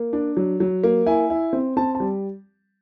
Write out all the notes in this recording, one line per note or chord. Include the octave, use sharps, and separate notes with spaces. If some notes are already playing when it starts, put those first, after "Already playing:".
Already playing: A#3
D4
F#3
F#3
A#3
E4 G#5
E4
C4
C4 A5
A5
G3